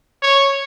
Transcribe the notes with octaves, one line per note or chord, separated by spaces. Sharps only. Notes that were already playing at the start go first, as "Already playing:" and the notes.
C#5